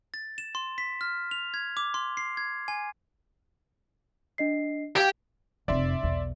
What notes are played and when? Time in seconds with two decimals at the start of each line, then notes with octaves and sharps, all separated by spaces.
0.14 A6
0.38 E7
0.55 C6
0.78 B6
1.01 F6
1.31 F7
1.54 G#6
1.77 D6
1.94 C6
2.17 C7
2.37 G#6
2.68 G#5
4.38 D4 D#5 C7
4.96 G4 F5 G#6 D7
5.68 F1 F2 D5 E5 C6
6.03 B1 E2